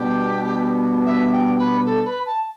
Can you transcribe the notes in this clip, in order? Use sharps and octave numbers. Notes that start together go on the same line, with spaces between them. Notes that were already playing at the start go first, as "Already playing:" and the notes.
Already playing: B2 G3 B3 D4 G4
E5
G5
B4
A4
B4
A5